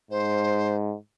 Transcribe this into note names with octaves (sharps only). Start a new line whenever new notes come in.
G#2 C5